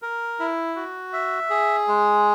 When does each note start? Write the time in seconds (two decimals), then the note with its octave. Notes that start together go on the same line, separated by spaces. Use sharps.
0.02 A#4
0.40 E4
0.76 F#4
1.13 E5
1.50 G#4
1.88 G#3